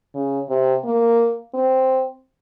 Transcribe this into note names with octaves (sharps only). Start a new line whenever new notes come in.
C#3
C3
A#3
C4